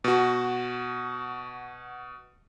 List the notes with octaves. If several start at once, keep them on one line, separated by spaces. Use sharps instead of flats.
B2 F#4